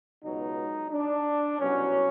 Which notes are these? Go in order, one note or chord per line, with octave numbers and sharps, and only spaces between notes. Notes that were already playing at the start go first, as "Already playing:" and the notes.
C#2 B2 F#3 D#4
D4
C2 B2 F#3 C#4